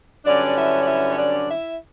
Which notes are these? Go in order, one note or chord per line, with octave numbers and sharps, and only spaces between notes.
G2 D3 F#3 C#4 D4 D5
E4 E5
D5
E4 E5
C#5
D4 D5
E4 E5